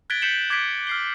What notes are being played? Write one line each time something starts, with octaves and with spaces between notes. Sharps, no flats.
F#6 G#6 A6 B6 D7 G7
G6 B6 C#7 E7 F#7 G7
D6 G#6 A6 B6 D7
F6 C7 G7